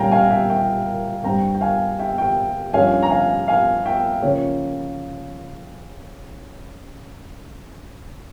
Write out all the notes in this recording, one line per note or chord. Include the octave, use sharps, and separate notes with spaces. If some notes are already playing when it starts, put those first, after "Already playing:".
Already playing: A#2 G3 C#4 F5 G5 G#5 A#5
F5 G#5
E5 G5
E5 G5
G2 G3 C4 G5 A#5
G5
F5 G#5
E5 G5
E5 G5
G2 F3 A#3 C#4 F5 G#5
A#5
F5 G#5
F5 G#5
E5 G5
C#3 F3 A#3 C#4